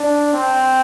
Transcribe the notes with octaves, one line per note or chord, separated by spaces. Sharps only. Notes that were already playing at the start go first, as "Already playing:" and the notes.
Already playing: D4
C4